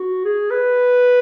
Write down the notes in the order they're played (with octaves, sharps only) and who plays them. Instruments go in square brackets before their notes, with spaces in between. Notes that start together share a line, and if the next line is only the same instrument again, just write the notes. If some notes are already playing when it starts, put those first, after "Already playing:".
Already playing: [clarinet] F#4
G#4
B4